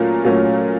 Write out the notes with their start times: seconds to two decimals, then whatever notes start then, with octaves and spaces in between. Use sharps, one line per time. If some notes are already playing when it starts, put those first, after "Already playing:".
Already playing: A#2 F#3 A3 C#4 A#4
0.24 A#2 F#3 A3 C#4